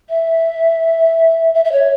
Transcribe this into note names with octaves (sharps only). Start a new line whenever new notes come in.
E5
E5
E5
C#5